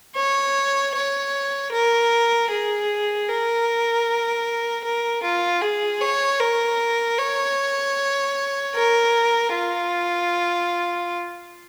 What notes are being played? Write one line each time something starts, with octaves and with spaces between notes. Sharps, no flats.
C#5
C#5
A#4
G#4
A#4
A#4
F4
G#4
C#5
A#4
C#5
A#4
F4